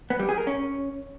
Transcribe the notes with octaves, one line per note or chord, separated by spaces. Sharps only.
B3
G3
G#4
A#4
C#4